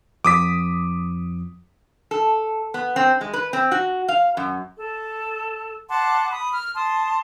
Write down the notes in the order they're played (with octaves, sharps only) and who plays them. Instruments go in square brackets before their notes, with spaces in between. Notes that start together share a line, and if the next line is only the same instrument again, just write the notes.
[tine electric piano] F2 F3 [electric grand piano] D6 D#6 B6
[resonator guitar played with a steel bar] A4
B3
C4
G#3
B4
C4
F#4
F5
F#2
[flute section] A4
F#5 A5 C6 D6
B5 D#6
F6
A5 C6 D#6